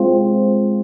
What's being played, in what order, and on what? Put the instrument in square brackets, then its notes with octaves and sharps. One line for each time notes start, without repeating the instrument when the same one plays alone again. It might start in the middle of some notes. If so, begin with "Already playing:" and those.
Already playing: [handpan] G#3 C4 F4